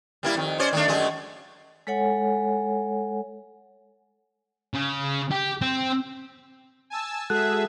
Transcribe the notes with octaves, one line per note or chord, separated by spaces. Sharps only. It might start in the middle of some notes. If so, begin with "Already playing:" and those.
G3 A#3 E4
F2 D#3
C#4 C5 D5
D#3 A3 D4
F#2 G#3 A3
G#3 A4 C#5 F#5 G#5
C#3
G4
C4
G#5 A5 E6
G#3 F#4 G#4 A4 E5 F#6